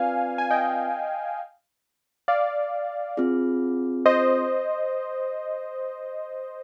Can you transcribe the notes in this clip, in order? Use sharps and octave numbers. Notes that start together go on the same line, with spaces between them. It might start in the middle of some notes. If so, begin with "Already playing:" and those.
Already playing: C4 F4 B4 D5 F5 G#5
G#5
D#5 G5
D5 F5
C4 F4 G#4
C5 D#5